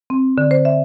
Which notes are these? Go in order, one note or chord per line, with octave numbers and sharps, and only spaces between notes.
C4
D3
C5
E5